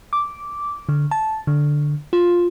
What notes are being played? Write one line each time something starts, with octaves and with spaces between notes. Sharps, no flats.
D6
D3
A5
D3
F4